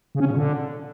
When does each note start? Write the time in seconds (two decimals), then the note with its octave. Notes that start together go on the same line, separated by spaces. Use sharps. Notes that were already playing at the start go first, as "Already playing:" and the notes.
0.15 C#3
0.20 C#4
0.25 C#3
0.31 A#2
0.36 D3